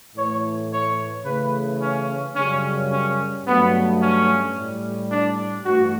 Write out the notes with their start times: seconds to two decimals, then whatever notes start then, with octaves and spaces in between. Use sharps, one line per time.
0.15 A2 E3 A3 C#5
0.71 C#5
1.25 C#3 E3 A3 B4
1.80 C#4
2.34 F#2 C#3 G3 C#4
2.89 C#4
3.45 G2 F#3 A3 B3
4.00 C#4
4.54 A2 G3
5.10 D4
5.64 G2 E3 A3 F#4